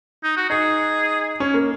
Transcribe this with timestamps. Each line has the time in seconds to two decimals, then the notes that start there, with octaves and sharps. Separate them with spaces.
0.24 D#4
0.37 F#4
0.50 D#4 G#4
1.40 C#4
1.54 A#3